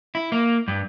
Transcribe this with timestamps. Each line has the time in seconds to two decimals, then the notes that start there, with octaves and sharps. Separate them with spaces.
0.15 E4
0.32 A#3
0.68 G2